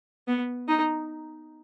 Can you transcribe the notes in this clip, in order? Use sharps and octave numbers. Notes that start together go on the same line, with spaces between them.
B3
D#4